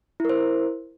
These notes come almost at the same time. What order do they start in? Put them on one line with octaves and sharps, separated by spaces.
E4 A#4 C5